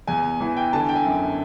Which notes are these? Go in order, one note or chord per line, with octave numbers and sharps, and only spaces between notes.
E2 G#5
E3 G#5
G5
D3 A5
G#5
G5
G#5
F#2